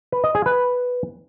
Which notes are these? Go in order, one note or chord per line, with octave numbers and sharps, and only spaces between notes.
B4
D#5
G#4
B4